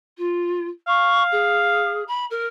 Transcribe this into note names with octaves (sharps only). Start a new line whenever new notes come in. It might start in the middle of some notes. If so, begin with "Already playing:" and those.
F4
F5 C#6
G#4
B5
A#4